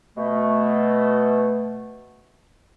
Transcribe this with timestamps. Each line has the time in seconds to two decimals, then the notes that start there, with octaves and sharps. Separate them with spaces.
0.17 B2 A3